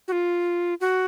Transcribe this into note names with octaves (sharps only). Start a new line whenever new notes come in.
F#4
F4
F#4